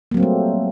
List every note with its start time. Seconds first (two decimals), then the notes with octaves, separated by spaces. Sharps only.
0.11 A#3
0.14 F#3
0.17 C4
0.20 G3
0.23 A3